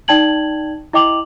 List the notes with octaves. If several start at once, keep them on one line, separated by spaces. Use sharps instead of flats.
D#4 D5 G5 A5 G#6 F#7
E4 D#5 G5 D6 F7 F#7